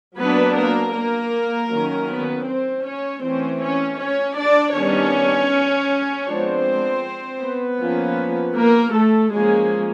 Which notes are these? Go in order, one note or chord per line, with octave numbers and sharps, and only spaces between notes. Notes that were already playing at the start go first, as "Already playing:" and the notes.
F#3 A#3 B3 D4 B4
A#3 A#4
A#3 A#4
D#3 F#3 A#3 C#4
B3 B4
C4 C5
C#4 C#5
E3 A3 C4 C#4 C5
C#4 C#5
C#4 C#5
D4 D5
D#3 G3 B3 C#4 D4 C#5
F3 G#3 B3 C4 D4 C5
B3 B4
F3 A#3 C#4
A#3 A#4
A3 A4
F3 G#3 A#3 C#4 G#4